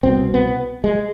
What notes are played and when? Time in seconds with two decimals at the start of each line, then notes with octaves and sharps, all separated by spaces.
0.03 C2 B2 C4
0.34 B3
0.84 G#3